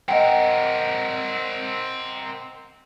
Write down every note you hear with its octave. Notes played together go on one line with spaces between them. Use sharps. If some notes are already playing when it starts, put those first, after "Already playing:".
C4 A#4 D#5 F#5 G5